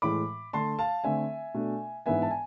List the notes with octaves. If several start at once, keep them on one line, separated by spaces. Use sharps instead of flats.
A2 E3 G#3 B5 D6
D3 A3 D4 A5 C6
F5 A5
D3 A3 C4 E5 G#5
B2 A3 D4
G#2 E3 B3 D4 E5 G#5
A5
G#5